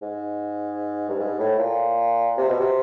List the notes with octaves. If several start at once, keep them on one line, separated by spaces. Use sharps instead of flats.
G#2
G2
G#2
A2
A#2
C3
B2
C3